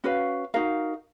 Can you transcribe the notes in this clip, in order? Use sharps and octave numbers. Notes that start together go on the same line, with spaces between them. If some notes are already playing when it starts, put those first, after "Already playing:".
C#4 F#4 B4 F5
D#4 F#4 A#4 F5